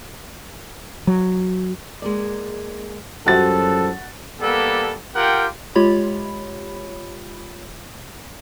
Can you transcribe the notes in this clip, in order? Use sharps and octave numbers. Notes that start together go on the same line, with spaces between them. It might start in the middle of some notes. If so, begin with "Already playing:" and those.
F#3
G#3 A#3 D5
F#2 F3 G3 F#4 A4 A6
G3 A#3 B3 A4
F4 G4 A#4 F#5 G5
G#3 F4 G4 C#5 B5